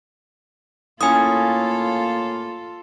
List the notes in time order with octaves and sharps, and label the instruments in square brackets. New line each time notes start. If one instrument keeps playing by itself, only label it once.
[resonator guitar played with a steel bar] A2 C#4 [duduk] A#3 [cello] F4 A4 [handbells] G#5 D#6